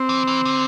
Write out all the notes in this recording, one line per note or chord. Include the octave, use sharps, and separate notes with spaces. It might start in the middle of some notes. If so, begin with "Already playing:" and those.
Already playing: C4
E3
E3
D3